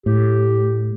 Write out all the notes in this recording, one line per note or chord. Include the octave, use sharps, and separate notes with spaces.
A2 G4